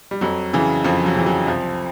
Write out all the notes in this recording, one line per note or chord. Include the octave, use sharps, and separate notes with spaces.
G3
F2 F#3
C#3 E3
F2 F3
F#3
C#3 E3
F#3
C2 F3